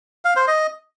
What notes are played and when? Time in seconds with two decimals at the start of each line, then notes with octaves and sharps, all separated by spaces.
0.25 F5
0.36 C5
0.48 D#5